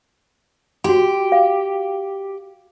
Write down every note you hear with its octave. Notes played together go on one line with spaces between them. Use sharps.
F#4 G4 C6
F5